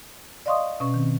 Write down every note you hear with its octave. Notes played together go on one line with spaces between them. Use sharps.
D5 D#5 F5 C6 C#6 D#6
B2 C#4 C#6
D#3 C4